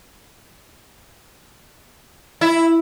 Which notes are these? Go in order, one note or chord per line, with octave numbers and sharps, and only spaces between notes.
E4